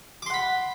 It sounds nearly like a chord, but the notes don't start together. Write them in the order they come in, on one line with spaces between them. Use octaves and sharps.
D6 C6 F#5 B5